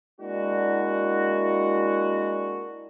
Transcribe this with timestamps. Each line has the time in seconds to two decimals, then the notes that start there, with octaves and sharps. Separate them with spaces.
0.21 G#3 A#3 D4 E4 F#4